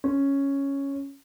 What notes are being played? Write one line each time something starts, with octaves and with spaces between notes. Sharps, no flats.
C#4